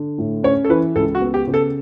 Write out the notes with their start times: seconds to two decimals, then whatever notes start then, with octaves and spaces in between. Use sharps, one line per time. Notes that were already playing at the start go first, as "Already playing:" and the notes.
Already playing: D3
0.18 A2
0.43 C#4 C#5
0.65 A4
0.69 E3 B4
0.95 C#2 A4
1.15 F#4
1.21 B3
1.34 G4
1.47 C#3
1.54 A4